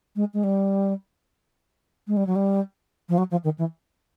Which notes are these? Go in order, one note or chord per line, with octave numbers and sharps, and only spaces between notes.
G#3
G#3
G3
G#3
G3
F#3
G3
F3
F#3
F3
D#3
E3